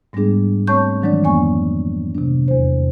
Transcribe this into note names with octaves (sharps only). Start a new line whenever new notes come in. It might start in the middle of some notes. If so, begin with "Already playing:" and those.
G#2 G3 G#3 B3 D4 G#4
A3 C4 C#5 A5 C#6 G6
D#3 E3 F#3 G#3 D4 D5
F2 F#3 A#3 B3 G#5 C#6
C3 D4
E2 C5